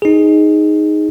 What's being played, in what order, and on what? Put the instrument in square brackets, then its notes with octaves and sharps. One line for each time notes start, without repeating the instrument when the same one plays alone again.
[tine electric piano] D#4 G#4